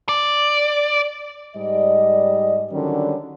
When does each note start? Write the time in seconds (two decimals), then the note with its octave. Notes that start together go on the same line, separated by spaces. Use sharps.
0.09 D5
1.56 G#2 G3 D5 D#5
2.72 D3 D#3 F#3 G3 C#4